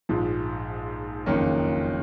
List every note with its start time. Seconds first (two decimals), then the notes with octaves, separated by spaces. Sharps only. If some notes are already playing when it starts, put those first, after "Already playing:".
0.09 A#1 G#2 F3 G#3
1.26 F#1 F2 D#3 A#3 C#4